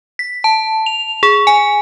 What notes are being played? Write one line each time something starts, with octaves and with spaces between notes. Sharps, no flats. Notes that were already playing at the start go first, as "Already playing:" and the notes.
B6
A5
F7
G#4
G#5